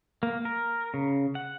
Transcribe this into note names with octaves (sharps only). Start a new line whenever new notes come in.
A#3
A#4
C#3
F#5